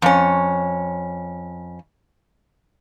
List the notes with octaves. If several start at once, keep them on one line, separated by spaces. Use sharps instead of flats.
F2 C#4